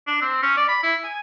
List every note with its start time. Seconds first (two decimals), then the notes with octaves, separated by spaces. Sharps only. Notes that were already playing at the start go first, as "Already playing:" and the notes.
0.07 D4
0.22 C4
0.43 C#4
0.57 D5
0.69 B5
0.83 E4
1.04 G#5